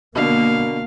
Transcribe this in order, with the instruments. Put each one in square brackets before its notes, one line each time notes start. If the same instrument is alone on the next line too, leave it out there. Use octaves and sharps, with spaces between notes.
[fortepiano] B2 D3 [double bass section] A#3 [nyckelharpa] F5